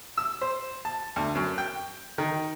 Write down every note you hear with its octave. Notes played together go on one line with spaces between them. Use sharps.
E6
C5
A5
D2
F#2
G5
D#3